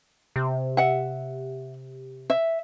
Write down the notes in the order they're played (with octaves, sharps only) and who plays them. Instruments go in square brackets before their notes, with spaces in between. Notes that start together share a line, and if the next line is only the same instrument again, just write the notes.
[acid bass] C3
[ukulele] E5 F#5
E5